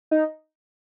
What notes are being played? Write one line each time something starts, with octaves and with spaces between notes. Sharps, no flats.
D#4